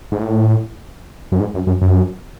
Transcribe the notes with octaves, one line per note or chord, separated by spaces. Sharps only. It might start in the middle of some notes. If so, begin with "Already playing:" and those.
G#2
A2
F#2
G#2
F#2
F#2
F#2